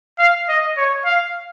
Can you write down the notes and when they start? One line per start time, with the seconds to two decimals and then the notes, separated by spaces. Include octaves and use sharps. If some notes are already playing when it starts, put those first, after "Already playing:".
0.19 F5
0.49 D#5
0.77 C#5
1.05 F5